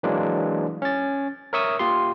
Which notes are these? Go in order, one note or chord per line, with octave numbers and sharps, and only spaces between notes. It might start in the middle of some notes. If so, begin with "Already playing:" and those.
E3 F#3 G#3 A#3 D4
C#4 A6
A#4 C#5 E5 C#6 D#6 E6
A#3 F4 G4 C6